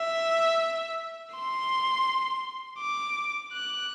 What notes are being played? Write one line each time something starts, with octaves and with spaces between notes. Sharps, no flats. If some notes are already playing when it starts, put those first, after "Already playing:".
Already playing: E5
C6
D6
F#6